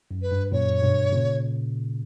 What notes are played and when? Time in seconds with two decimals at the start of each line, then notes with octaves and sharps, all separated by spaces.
0.11 F#2
0.22 B4
0.31 G2
0.52 F#2 A#2 C#5
0.82 G2 B2
1.12 A#2 C#3